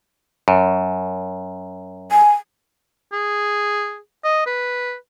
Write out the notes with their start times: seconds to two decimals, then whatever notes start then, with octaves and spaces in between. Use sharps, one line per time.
0.48 F#2
2.12 G#5
3.13 G#4
4.24 D#5
4.47 B4